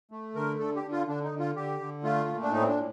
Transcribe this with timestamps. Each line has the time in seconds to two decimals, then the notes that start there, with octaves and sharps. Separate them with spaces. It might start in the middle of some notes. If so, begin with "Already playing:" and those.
0.11 A3
0.35 D3 A#4
0.59 D3 A4
0.76 G4
0.84 D3
0.92 F4
1.07 D3 D4
1.24 D#4
1.32 D3
1.40 F4
1.56 D3 G4
1.80 D3
2.04 A3 F4
2.28 A#2
2.42 D4
2.52 A2 D#4
2.62 C4
2.69 D4
2.77 A2